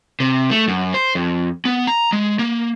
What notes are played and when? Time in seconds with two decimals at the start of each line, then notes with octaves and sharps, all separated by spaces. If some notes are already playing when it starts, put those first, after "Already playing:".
0.20 C3
0.51 A3
0.68 F#2
0.94 C5
1.15 F2
1.65 B3
1.87 A#5
2.13 G#3
2.39 A#3